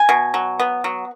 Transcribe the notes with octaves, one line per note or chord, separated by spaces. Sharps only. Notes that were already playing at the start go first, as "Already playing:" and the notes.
Already playing: G#5
B2
F#3
B3
F#3